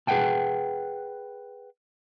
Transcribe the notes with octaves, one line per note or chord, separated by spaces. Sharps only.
G#4 B4 E5 F#5 G5 A5